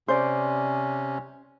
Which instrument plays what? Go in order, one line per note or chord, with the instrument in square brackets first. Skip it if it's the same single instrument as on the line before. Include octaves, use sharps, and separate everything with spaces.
[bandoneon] C3 C#4 [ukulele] C5 D5